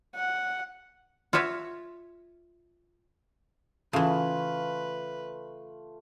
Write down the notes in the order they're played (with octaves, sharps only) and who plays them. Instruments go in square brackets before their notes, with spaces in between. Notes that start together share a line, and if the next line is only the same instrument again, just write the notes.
[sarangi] F#5
[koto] F4 F#4 C#5 E5 F5
[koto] C#3 E3 [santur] A3 F4 [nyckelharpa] B4